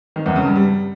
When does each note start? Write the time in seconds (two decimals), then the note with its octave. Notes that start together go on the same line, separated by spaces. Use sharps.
0.16 D#3
0.26 E2
0.36 C#3
0.46 G2
0.56 G3